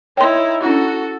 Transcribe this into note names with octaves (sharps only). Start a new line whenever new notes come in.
D#4 E4 C#5 G5 C6
C#4 D4 E4 F#4 A4